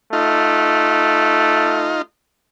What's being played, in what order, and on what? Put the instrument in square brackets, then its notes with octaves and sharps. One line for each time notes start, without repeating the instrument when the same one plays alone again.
[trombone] A3 [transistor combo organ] D#4 F4